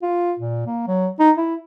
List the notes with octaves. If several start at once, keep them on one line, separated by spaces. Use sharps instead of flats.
F4
A#2
A#3
F#3
D#4
E4